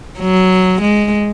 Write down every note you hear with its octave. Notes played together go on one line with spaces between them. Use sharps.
F#3
G#3